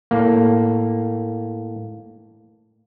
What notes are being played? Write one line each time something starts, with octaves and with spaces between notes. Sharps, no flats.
A2 A#3